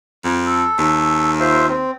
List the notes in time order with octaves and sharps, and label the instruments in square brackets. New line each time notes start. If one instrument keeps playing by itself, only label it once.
[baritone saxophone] F2
[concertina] A4
[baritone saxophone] D#2
[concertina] F4 C5 E5
C4